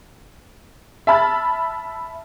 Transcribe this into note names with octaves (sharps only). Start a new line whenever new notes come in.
E5 A5 B5 F6 A6